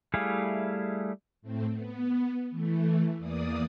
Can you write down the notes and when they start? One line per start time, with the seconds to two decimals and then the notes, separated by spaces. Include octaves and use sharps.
0.14 G3 A3 E4 G#4 F5
1.42 A2 A3 C4
1.72 B3
2.51 E3 A3
3.18 E2 E3 A#3 D5 D#6